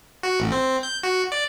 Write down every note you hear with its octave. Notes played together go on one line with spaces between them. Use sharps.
F#4
A1
C4
G6
F#4
D5